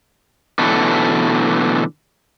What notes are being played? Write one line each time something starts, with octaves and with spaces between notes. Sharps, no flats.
B2 D3 E3 F#3 A3